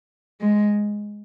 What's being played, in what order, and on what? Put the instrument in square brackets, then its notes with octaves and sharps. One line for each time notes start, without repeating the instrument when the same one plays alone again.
[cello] G#3